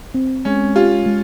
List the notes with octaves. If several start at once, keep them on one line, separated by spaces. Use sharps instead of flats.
C4
G#3 C#4
F4 G4
G#3